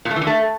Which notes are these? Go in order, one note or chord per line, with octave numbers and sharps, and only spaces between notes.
A#2
A3
E3
D3
A3